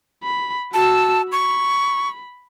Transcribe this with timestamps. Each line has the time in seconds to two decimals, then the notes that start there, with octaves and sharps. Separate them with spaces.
0.24 B5
0.74 F#4 A5 E6
1.32 B5 C#6